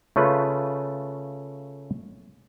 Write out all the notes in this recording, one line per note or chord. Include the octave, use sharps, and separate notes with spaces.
C#3 A3 C#4 F4 B4